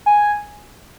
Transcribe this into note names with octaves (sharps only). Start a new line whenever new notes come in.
G#5